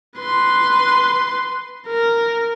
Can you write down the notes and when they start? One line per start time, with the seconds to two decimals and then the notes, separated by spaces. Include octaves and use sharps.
0.19 B4 C6
1.87 A#4